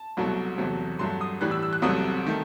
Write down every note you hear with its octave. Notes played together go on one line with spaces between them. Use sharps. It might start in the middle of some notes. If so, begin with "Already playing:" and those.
Already playing: A5
C2 B2 F#3 A3
E2 C3 F#3 A3
G2 F#3 A3 C6
D#6
A2 E3 G3 F#6
E6
E6
F#6
C2 C3 F#3 A3 D#6
D#3 A3